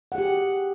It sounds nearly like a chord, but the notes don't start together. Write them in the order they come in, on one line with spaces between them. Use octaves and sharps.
F#5 G#4 G4